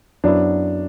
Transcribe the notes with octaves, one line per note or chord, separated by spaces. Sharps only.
F#2 F#3 B3 D4 E4